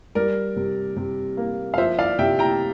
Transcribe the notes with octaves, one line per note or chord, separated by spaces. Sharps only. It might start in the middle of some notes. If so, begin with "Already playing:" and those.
G3 A#4 D5
C3
C3
A#3
F5
F3 C5 E5
D5 F5
C3 E5 G5
G5 A#5